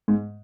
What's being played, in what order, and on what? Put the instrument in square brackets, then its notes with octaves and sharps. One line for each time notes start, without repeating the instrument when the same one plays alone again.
[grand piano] G#2